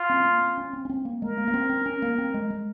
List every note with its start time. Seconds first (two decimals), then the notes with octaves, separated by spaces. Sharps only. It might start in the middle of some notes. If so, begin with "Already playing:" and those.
Already playing: F4
0.09 C4
0.20 C4
0.25 A#3
0.42 C4
0.57 C#4
0.73 C4
0.85 C#4
0.89 C4
1.05 A#3
1.22 G#3 A#4
1.37 A#3
1.48 A#3
1.54 C4
1.70 C4
1.86 C#4
2.02 A#3
2.18 C4
2.34 G#3
2.50 G#3